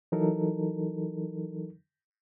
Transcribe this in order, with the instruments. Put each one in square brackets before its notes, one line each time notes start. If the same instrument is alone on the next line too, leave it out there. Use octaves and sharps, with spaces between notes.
[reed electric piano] E3 F#3 D#4 A4 A#4